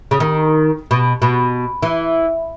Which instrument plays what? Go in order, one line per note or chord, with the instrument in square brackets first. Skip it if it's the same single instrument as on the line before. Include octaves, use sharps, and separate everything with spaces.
[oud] C#3
D#3
B2
B2
E3